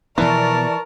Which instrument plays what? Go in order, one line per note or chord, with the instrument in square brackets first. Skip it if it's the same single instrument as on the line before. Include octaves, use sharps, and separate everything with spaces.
[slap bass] B2 F3 B3 [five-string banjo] E3 [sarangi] A#4 [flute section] D5 A5 C#6